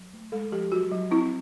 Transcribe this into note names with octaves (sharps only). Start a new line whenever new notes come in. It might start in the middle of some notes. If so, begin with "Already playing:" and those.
Already playing: F#3
A3
G#3 A4
F3 G4
F#3 F#4
F#3
C4 E4